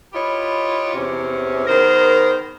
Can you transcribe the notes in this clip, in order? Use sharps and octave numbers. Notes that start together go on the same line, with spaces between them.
E4 F4 G4 B4 C#5 D#5
E2 C3 C#4
D#3 B3 G#4 A#4 C5